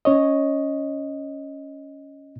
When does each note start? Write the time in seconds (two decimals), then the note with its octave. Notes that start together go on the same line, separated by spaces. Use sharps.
0.05 C#4 C#5 D#5